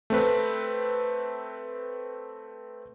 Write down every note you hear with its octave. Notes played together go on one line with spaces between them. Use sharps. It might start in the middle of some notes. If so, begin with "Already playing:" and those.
A3 C4 B4